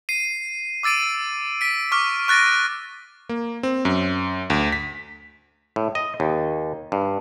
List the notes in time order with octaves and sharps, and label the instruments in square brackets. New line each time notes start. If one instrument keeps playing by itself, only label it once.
[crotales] C7 D#7
D6 E6 A6 D7 D#7
B6 D7
C#6 D6 F6
C#6 F#6 A6 A#6 D7
[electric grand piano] A#3
C4
F#2
D2
B6
[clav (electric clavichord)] A2
D#5
D#2
G2